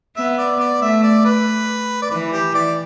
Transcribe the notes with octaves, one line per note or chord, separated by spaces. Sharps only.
B3 E5
D5
D5
A3 E5
D5
B4
D5
E3 B4
G4
D5